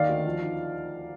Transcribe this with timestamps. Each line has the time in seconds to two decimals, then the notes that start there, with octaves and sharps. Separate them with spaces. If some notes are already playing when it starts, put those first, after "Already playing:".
Already playing: D#2 D#3 D5 F5
0.09 D2
0.26 F3
0.42 D#4